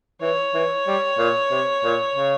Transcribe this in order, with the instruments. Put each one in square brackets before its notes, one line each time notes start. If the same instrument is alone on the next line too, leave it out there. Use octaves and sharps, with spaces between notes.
[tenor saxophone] E3 [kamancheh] C#5
[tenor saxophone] E3
G3
A#2
C3
A#2
C#3